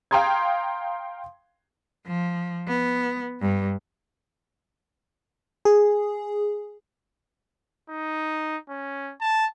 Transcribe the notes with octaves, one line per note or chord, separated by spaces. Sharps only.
F5 G5 A#5 C6 D#6 G#6
F3
B3
G2
G#4
D#4
C#4
A5